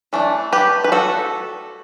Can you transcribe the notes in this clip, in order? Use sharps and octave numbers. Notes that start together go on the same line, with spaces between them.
E3 A3 D4
G4 B4
B4
F#4 A4